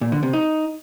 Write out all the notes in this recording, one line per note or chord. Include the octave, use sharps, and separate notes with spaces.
A#2
D3
C3
D#4